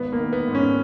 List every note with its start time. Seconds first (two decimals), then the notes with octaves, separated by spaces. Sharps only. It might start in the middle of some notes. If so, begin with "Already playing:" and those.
Already playing: G#1 B3
0.12 A#3
0.19 D#3
0.33 B3
0.48 G#2
0.55 C#4